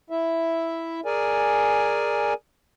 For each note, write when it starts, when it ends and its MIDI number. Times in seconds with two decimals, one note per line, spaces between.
0.10 1.00 64
0.10 1.00 76
1.05 2.34 68
1.05 2.34 70
1.05 2.34 74
1.05 2.34 80